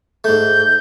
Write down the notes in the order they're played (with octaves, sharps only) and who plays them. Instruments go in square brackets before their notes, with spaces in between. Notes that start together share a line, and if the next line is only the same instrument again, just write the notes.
[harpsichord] G#2 A3 [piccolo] G6